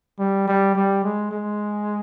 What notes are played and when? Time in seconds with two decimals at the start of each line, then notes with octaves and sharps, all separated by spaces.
0.19 G3
0.47 G3
0.75 G3
1.03 G#3
1.31 G#3